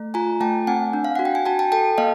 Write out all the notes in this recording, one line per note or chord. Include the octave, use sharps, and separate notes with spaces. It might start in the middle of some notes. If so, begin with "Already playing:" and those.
Already playing: A3
F4 G#5 A#5
A3 G5 A5
C4 F#5 G#5
D4
F5
F#4 F#5
G5
G#5
F#4 G5 A5
G5 A5
A4 G5 A5
A#3 D#5 F5